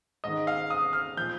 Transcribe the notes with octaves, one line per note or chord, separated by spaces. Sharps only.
G#2 D#3 D#5
F5
D#6
F6
A#2 F3 G6